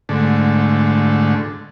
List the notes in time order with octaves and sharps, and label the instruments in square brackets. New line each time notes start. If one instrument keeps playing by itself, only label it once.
[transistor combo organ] G#2 D3 A3